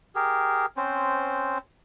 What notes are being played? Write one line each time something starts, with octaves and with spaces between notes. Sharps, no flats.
G4 G#4 A#4
C4 C#4 C5